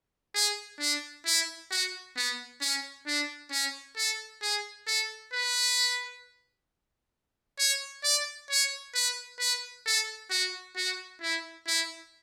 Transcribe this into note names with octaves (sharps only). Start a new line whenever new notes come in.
G#4
D4
E4
F#4
B3
C#4
D4
C#4
A4
G#4
A4
B4
C#5
D5
C#5
B4
B4
A4
F#4
F#4
E4
E4